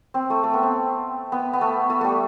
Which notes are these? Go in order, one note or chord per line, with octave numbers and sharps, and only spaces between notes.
C4
A3
A3
B3
C4
B3
B3
A3
A3
G3 A3